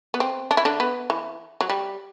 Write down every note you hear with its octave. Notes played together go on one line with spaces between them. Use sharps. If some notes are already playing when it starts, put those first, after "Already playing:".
B3
C4
D4
E4
D3 D4
B3
E3
F#3
G3